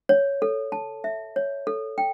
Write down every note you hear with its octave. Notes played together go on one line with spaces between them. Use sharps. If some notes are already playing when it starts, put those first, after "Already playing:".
C#5
A4
A5
E5
C#5
A4
G5